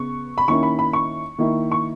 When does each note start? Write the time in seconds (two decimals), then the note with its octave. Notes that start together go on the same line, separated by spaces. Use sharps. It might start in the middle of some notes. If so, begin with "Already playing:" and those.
Already playing: C#3 B3 C#6
0.38 B5
0.48 D#3 A#3 C#4 E4 C#6
0.63 B5
0.79 B5
0.93 C#6
1.38 D#3 A#3 E4
1.72 C#6